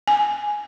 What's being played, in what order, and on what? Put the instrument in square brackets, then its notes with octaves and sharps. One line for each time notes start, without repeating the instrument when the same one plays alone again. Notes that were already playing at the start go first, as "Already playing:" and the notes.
[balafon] G#5